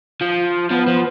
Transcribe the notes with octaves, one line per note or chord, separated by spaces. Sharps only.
F3
F3 B3
F3